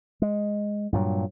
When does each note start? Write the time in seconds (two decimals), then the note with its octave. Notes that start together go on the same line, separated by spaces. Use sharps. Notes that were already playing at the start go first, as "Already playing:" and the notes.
0.22 G#3
0.93 G2 A#2 F#3